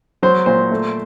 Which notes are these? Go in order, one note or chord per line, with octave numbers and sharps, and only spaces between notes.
F#3 C5
A#2 C5
A3